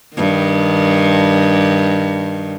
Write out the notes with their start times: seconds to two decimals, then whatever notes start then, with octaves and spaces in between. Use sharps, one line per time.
0.15 G2 D#3